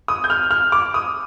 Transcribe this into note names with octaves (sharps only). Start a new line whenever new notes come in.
D#6
G6
F6
F6
D6
D#6